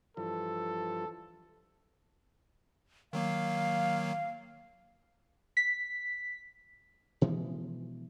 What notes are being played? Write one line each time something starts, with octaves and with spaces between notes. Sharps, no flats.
G2 E3 F3 A4
D#3 F#3 A#3 F5
B6
B2 E3 F3 G#3